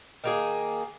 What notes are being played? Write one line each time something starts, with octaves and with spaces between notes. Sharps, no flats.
D#3 A#3 G#4